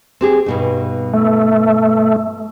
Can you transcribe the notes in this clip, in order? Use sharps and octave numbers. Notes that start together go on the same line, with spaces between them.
C4 G4 G#4
G2 B2 D#4
A3